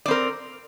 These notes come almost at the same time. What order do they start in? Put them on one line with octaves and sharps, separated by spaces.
D5 C4 A#4